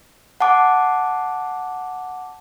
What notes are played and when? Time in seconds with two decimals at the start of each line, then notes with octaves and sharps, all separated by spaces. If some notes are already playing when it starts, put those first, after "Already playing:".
0.40 F#5 A5 D6